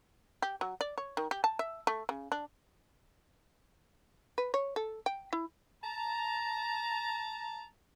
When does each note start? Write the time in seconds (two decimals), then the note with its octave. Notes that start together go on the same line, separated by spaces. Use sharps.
0.42 G4
0.61 F#3
0.81 D5
0.98 C#5
1.17 D#3
1.31 G4
1.44 A5
1.59 E5
1.87 A3
2.09 C#3
2.32 D4
4.38 B4
4.54 C#5
4.76 A4
5.06 G5
5.33 E4
5.83 A5 A#5